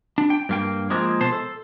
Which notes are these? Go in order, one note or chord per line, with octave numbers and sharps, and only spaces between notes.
D4
G5
G2 A#3 G5
F3 G#3 A#3 C4
B2 C5 A5
A4